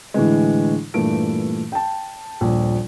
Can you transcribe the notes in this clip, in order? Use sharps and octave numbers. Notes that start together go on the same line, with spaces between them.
A2 D3 E3 G#3
G2 A#2 E3 A3 D7
G5 A5
D#1 A#1